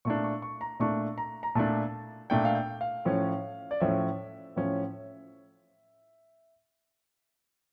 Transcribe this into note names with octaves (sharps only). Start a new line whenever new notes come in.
A#2 A3 D4 C#6
C#6
C#6
A#5
A#2 A3 D4 C#6
A#5
A#5
A#2 A3 D4 A5
A#2 A3 D4 G5
F5
G5
F5
A2 F3 C#4
D5
A2 F3 C#4 E5
A2 F3 C#4